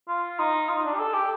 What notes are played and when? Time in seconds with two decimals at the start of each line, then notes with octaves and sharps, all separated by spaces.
0.08 F4
0.39 D#4
0.69 F4
0.78 D#4
0.85 D4
0.94 G4
0.99 A4
1.14 G4